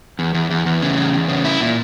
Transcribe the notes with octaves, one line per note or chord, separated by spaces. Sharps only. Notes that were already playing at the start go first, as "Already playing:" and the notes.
E2
E2
E2
E2
C#3
E2
E2
C#3
E4
A#2